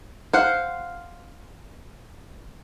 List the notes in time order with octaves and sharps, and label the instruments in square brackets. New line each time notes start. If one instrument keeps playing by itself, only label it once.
[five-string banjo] C5 F#5 [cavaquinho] F5